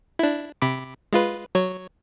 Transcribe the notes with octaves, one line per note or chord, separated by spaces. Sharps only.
D4 E4
C3 B5 D6
G#3 F4 B4
F#3 C#5